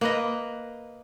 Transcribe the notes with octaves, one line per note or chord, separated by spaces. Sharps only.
A#3 B4 D#5